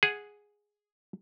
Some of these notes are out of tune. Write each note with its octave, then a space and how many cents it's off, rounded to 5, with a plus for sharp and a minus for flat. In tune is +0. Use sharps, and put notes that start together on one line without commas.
G#4 +0 F#5 -5